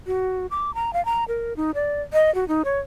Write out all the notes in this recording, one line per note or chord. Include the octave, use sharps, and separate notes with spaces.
F#4
D6
A#5
F5
A#5
A#4
D#4
D5
D#5
F#4
D#4
C#5